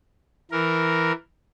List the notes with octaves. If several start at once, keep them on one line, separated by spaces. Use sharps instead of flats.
E3 A#4